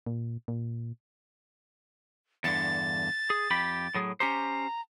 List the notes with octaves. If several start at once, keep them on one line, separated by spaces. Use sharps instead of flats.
A#2
A#2
E2 G2 D3 A6
G#4
F2 G4 B5
A2 F#3 G#4
C#4 G4 C5 A#5